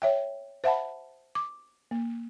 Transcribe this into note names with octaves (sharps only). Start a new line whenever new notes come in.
C#5 E5 G5
C5 E5 F#5 A5 B5
D6
A#3